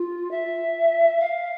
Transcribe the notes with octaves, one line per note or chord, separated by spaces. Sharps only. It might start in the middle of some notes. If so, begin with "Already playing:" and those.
Already playing: F4
E5
F5